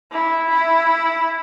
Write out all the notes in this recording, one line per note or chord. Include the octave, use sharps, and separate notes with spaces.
E4
E4